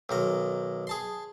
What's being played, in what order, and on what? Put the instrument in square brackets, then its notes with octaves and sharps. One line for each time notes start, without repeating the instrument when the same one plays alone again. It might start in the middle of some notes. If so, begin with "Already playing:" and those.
[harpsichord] B1 D#3 D#5
G#4 A5 C6